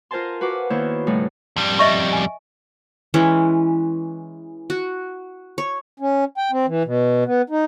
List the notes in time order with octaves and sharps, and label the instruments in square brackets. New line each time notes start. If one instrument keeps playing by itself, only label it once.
[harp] F4 A#4 C5 G#5 A5 C6
F#4 B4 F5 D6
D#3 A#3 B3 E4 C5 C#5
A2 C#3 G3 A3 D#4 F#4
[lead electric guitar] F2 G3
[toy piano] D#5 E5 C#6
G#5
[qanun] E3 G#3 C#4
F#4
C#5
[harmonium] C#4
G5
C4
E3
B2
B3
D#4